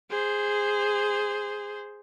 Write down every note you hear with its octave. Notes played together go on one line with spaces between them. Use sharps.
G#4 C5